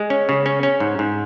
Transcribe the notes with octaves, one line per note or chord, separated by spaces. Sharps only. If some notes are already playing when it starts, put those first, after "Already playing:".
Already playing: G#3
C#4
C#3
C#4
C#4
G#2
G#2